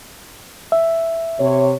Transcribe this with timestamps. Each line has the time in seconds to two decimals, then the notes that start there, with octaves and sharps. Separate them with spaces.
0.72 E5
1.40 C3 C#5